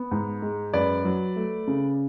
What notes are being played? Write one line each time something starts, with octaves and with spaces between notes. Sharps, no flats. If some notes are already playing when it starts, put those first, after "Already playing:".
Already playing: B3
G#2
G#3
F#2 B4 D5
F#3
A3
C#3